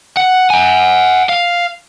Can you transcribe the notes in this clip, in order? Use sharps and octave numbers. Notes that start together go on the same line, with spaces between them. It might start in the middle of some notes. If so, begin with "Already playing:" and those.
F#5
F#5 G#5
F5